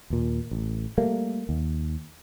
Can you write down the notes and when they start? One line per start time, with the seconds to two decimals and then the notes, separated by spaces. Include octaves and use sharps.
0.10 D#2 A#2
0.51 A1
0.98 G3 A3 A#3
1.49 D#2